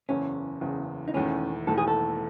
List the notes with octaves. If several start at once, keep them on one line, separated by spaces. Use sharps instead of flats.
F#1 E2 C#3 C#4
F#1 E2 C#3
D#4
E1 E2 D#3 A3 C#4 E4
E1 E2 D#3 A3 E4 A4
G#4
A4